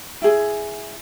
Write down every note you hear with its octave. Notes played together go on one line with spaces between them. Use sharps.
E4 G#4